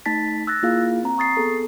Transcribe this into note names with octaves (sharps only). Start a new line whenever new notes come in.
A3 D#4 A5 A6 B6
E6 F#6 A6 A#6
A#3 E4 F4 G#4 F5
C4 A#5
C#6 D#6 A6 C7
B3 G#4 A4